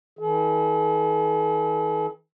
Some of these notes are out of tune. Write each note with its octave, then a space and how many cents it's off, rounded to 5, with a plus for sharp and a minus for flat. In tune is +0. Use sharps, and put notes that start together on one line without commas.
E3 -45 A4 -45